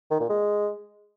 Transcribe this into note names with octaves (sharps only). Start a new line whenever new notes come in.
D#3
A#2
G#3